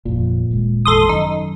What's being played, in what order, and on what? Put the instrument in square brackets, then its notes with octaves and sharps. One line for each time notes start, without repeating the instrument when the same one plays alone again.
[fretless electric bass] G1 F2 [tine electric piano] A#2
[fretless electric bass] D#1 G#3
[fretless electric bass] G#1 E2 G#2 [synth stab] A4 C6 D#6
[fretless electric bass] F#2 D#3 [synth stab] D#4